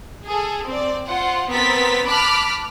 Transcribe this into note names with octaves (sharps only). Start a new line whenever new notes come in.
G#4 A4
C4 D5
F4 C5 F#5
B3 C4 A#4 A6 B6
A5 B5 D6 F6 F#6